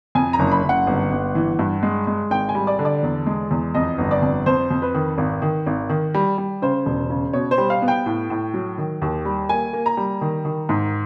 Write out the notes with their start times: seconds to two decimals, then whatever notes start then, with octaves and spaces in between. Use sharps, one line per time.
0.15 F2 G#5
0.33 A#5
0.39 F#1
0.51 B5
0.63 F#1
0.69 F#5
0.87 G1
1.11 G1
1.35 E3
1.59 G2
1.83 G#3
2.07 G#3
2.31 G#1 G5
2.49 G#5
2.55 G3
2.67 D5
2.79 D3
2.85 D5
3.03 E2
3.26 G#3
3.51 E2
3.74 F2 D#5
3.98 G1
4.11 D5
4.22 F2
4.46 F2 C5
4.71 F2
4.82 B4
4.94 D#3
5.18 G#1
5.42 D#3
5.66 G#1
5.89 D#3
6.14 G3
6.38 G3
6.62 C#3 C5
6.86 E1
7.10 C#3
7.33 B2 C#5
7.51 C5
7.58 G3
7.70 F5
7.82 B3
7.88 G5
8.06 A2
8.30 A2
8.54 F#3
8.78 D#3
9.02 D#2
9.25 G3
9.49 A#3 G#5
9.73 A#3
9.86 A#5
9.97 G3
10.21 D#3
10.45 D#3
10.69 G#2